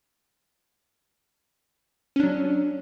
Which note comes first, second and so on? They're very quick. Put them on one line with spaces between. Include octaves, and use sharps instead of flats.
C#4 D4 F#3